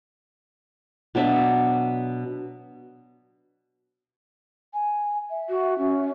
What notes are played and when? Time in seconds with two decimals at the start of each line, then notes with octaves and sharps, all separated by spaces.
1.15 B2 F#3 D4 E5
4.74 G#5
5.30 E5
5.50 F#4
5.78 C#4